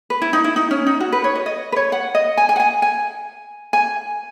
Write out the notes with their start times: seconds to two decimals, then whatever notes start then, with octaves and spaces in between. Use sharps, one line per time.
0.10 B4
0.22 E4
0.33 D#4
0.44 E4
0.56 D#4
0.71 C#4
0.86 D#4
1.00 F#4
1.12 B4
1.24 C#5
1.35 D#5
1.46 D#5
1.72 B4
1.76 C#5
1.92 F#5
2.15 D#5
2.37 G#5
2.49 G#5
2.56 F#5
2.60 G#5
2.82 G#5
3.73 G#5